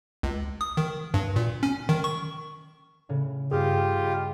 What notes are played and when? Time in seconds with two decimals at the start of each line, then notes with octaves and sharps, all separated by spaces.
0.23 C#2
0.61 D#6
0.77 D#3
1.14 G2
1.36 A#2
1.63 C#4
1.89 D#3
2.04 C#6
3.09 A2 C#3
3.51 G2 F4 G4 G#4
4.01 B4 D#5